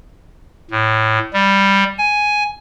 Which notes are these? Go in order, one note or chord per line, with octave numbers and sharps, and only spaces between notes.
A2
G3
G#5